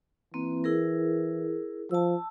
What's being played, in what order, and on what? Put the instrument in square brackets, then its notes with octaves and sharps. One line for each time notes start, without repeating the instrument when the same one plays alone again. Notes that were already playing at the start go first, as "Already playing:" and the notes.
[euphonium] E3 [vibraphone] A#3 C4
[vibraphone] E4 G#4 A#4
[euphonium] F3 [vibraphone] A5 E6